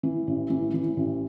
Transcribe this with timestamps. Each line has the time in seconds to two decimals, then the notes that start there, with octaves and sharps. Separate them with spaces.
0.03 E3
0.27 A1
0.50 E3
0.74 E3
0.97 A1